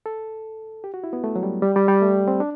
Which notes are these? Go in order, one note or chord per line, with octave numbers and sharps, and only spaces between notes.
A4
G4
F#4
E4
B3
A3
F#3
G3
G3
G3
G3
A3
C4
D4